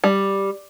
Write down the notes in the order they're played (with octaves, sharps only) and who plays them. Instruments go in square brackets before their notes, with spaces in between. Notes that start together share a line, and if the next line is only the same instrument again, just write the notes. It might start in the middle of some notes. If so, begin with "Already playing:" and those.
[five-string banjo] G3